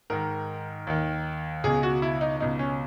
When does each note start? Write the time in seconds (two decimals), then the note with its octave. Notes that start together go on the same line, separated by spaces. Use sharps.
0.10 G#2 D#3 A#4
0.87 D#2 D#3
1.64 C#2 B2 G#4
1.83 F#4
2.02 E4
2.21 D#4
2.40 C#2 B2 D#4
2.59 C#4